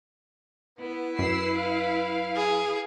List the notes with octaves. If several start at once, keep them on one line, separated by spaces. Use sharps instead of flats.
B3 E4 B4
F#2 E6 C7
F5
G#4